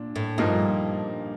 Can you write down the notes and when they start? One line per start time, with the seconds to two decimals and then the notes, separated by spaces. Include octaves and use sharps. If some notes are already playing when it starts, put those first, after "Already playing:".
Already playing: A#2 D4
0.16 A2
0.38 G2 A#2 F3 A#3 D#4